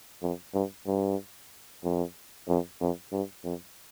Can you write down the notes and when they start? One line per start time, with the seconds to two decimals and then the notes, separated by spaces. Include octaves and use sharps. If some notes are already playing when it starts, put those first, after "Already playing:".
0.22 F2
0.54 G2
0.87 G2
1.83 F2
2.48 F2
2.81 F2
3.12 G2
3.44 F2